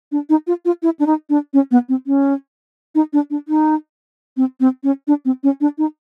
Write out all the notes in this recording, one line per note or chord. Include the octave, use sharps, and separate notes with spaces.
D4
D#4
F4
F4
E4
D4
D#4
D4
C#4
B3
C4
C#4
D#4
D4
D4
D#4
C4
C4
C#4
D4
C4
C#4
D4
D#4